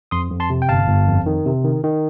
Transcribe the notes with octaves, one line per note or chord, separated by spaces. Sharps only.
F2 C6 D#6
F2
A5 C6
C3
G5
G1 F5 A5
G1
F2
D#3
C3
D#3
D#3